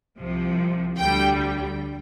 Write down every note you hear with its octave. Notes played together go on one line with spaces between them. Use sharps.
C2 C3 F3
D2 D3 G3 G5